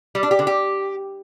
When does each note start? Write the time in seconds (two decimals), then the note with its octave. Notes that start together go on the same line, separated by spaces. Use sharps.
0.15 G3
0.23 D4
0.31 G4
0.39 D3
0.47 G4